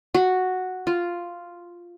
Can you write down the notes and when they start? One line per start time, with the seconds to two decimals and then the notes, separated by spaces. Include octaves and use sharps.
0.14 F#4
0.87 F4